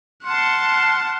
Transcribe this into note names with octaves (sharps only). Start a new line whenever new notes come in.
F#5 A5 C6 F6